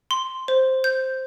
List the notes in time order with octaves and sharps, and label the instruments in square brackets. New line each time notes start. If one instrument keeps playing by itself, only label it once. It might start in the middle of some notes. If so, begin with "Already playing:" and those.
[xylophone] C6
C5
G6